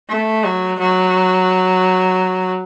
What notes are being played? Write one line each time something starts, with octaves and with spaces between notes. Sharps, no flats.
A3
F#3
F#3